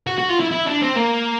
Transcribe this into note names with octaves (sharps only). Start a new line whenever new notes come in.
F#4
F#4
F4
E4
E4
D4
C4
A#3